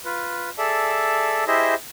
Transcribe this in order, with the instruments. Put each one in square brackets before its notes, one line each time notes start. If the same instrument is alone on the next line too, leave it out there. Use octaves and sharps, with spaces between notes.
[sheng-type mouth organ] F4 B4
G#4 A4 D5 E5 A5
E4 G4 G#4 C5 D#5 E5